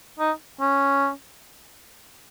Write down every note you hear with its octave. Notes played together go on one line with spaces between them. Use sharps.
D#4
C#4